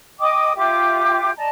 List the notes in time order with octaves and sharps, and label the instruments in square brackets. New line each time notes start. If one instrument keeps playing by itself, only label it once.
[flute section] D#5 G5 D6 D#6
F4 G4 E5 D6
D5 D#5 A5 A#5